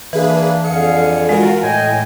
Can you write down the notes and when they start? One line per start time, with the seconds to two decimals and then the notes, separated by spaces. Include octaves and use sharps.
0.13 E3 A#3 D4 G#4 B4
0.64 F2 D3 G#4 F5 C#7
1.29 G#3 F4 F#4 A#4
1.63 A2 D#5 G5 G#5